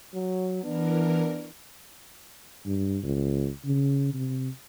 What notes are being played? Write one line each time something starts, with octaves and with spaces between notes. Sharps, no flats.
F#3
E3 B3 D4 A#4
G2
C#2
C#3
C3